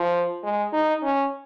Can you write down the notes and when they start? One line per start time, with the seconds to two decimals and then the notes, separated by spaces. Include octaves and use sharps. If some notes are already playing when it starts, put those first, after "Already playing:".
Already playing: F3
0.44 G#3
0.73 D#4
1.03 C#4